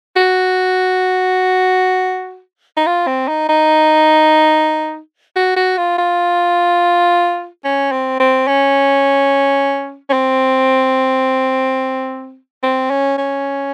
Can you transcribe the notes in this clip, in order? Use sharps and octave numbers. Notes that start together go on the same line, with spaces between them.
F#4
D#4
F4
C4
D#4
D#4
F#4
F#4
F4
F4
C#4
C4
C4
C#4
C#4
C4
C4
C#4
C#4